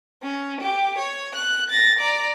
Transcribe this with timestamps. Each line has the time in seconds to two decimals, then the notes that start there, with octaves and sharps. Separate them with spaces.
0.23 C#4
0.61 G4
0.98 C#5
1.35 F#6
1.70 A6 A#6
1.99 D5 A#5